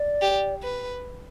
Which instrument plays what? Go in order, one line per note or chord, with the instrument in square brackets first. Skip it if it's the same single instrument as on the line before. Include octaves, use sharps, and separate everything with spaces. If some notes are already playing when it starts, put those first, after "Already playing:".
Already playing: [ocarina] D5
[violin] G4
B4